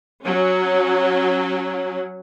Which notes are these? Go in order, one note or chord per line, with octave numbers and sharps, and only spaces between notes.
F#3 C#4